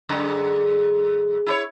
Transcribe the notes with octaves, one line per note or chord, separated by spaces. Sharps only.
F#2 D3 G#3
E4 G#4 C#5